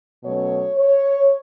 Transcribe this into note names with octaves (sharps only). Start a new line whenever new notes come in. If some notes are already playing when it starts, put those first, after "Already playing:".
B2 F#3 A3 C#4 C#5
C#5